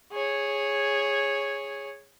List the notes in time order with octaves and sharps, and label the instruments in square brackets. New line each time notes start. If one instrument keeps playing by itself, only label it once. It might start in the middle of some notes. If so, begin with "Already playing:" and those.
[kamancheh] G#4 C#5